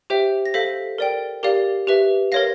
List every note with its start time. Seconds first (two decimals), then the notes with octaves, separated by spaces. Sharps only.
0.10 G4 C5 E5 G5
0.46 A#6
0.54 A4 C5 F5 B6
0.98 A#4 D5 G5
1.43 G4 A#4 D5 F5
1.87 G4 B4 E5
2.32 A#4 C#5 F5 A#6